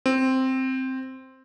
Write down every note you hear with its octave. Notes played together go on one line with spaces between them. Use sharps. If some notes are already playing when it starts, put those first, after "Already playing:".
C4